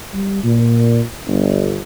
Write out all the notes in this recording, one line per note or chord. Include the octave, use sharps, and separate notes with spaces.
G3
A#2
G1